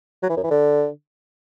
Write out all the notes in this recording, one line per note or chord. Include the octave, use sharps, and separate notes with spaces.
F#3
E3
F#2
E3
D3